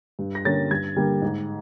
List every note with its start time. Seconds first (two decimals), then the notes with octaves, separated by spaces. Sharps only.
0.19 G2
0.35 A#6
0.45 D3 G3 A#3 C#4 A6
0.71 G2 G#6
0.96 D3 G3 A#3
1.22 G#2